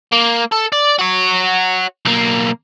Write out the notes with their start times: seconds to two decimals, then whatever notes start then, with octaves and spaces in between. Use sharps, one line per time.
0.13 A#3
0.52 A4
0.73 D5
0.99 F#4 C#5
2.05 B1 A#3